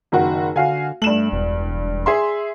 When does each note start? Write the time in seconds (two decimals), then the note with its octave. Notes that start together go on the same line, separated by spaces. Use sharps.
0.12 F#1 D#3 F#4
0.56 D3 F#4 F5 G#5
1.02 G2 A3 E7 F#7
1.33 E1
2.06 G#4 E5 C6